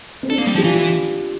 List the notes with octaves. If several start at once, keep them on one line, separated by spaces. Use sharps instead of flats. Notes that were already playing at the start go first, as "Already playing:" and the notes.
C4
D4 A4
A#3
G3
F3 G4
E3 F4